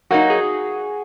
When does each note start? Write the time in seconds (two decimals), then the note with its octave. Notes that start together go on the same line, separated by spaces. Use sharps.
0.11 F#3 A#3 D#4 F#4
0.30 G#4